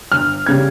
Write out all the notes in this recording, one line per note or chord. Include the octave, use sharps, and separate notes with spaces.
G1 F6
C#3 G3 G#6